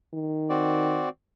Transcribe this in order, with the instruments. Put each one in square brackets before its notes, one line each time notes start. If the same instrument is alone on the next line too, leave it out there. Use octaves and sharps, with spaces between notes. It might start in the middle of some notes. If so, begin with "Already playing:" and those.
[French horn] D#3
[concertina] C4 F#4 D5